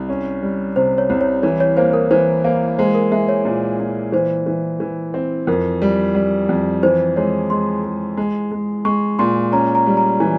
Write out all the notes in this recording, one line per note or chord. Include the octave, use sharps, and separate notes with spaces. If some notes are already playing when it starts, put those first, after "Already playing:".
Already playing: C2
C#4
G3
C3 C5
C#5
C2
C#5
E3 C#5
C#5
A#3 C5
A#4
E3 C5
A#3 C5
G#3 C5
A#4
G#3 E5
C#5
A#2
A#2
E3 C5
E3
E3
C4
F2 A#4
G3
G3
F2
E3 C5
G#3 C#5
G#3 C6
G#3
G#3
G#3
G#3 C#6
A#2 C6
C#4 A#5
A#5
G3
A#5
E3 G#5